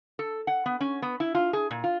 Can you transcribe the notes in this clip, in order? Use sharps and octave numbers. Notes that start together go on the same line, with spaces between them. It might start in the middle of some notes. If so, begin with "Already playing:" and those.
A4
F#5
B3
C#4
B3
E4
F4
G#4
A#2
F4